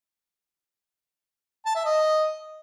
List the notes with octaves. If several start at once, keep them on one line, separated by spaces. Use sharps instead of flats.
A5
E5
D#5